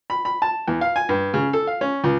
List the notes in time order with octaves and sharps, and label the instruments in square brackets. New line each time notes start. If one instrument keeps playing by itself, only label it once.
[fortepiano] B5
B5
A5
E2
F5
G#5
G2
C#3
A4
F5
C#4
C#2